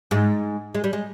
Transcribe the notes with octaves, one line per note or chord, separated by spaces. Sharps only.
G#2 G#3
G#3
G3
G#3